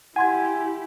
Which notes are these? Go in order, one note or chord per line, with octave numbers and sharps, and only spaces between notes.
E4 G4 F#5 G#5 C6 G#6